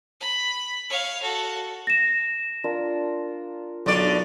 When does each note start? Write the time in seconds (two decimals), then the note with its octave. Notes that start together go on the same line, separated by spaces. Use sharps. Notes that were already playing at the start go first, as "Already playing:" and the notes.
0.21 B5
0.90 C#5 F5
1.22 F#4 A4
1.87 A#6 E7
2.64 D4 F4 A#4
3.86 B1 D3 D5